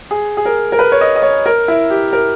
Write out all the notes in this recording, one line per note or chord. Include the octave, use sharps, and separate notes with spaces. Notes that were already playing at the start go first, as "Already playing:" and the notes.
G#4
G#4
A#4
A#4
B4
C#5
D#5
D#5
C#5
A#4
E4
G4
A#4